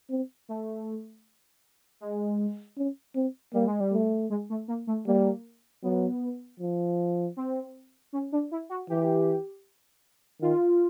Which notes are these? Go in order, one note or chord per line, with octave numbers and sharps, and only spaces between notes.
C4
A3
G#3
C#4
C4
G3 A#3
G#3
G3
A3
G#3
A3
A#3
A3
G3 A#3
F#3 B3
F3
C4
C#4
D4
E4
F#4
E3 G4
D#3 F4